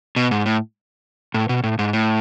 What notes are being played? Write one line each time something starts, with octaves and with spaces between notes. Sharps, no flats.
B2
G#2
A2
A2
B2
A2
G#2
A2